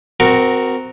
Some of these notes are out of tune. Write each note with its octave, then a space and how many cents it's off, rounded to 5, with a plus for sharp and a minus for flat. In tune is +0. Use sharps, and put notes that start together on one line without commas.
C4 -20 F#4 +0 A#4 +0